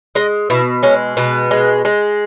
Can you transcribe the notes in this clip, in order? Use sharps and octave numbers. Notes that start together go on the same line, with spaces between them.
G#3 D#5
B2 E4
G#3 C#4
B2 B3
G#3
G#3